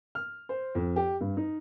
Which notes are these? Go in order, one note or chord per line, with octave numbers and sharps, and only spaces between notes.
F6
C5
F2
G4
G2
D#4